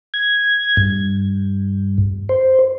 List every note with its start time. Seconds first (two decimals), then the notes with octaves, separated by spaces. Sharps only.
0.14 G#6
0.77 G2
2.29 C5